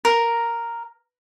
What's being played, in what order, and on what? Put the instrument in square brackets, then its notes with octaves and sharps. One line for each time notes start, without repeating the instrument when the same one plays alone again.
[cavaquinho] A#4